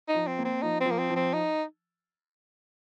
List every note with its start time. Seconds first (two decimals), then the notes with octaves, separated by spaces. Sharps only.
0.08 D#4
0.15 F3
0.27 C4
0.39 A#3
0.45 C4
0.62 F3 D#4
0.80 C4
0.86 F3
0.91 A#3
0.98 C4
1.10 F3
1.16 C4
1.33 D#4